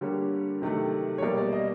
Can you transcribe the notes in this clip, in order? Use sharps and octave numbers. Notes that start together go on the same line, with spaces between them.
D3 G3 A#3 C#5
C3 D#3 F#3 A3
C#5
B2 G3 A#3 D5
D5
D#5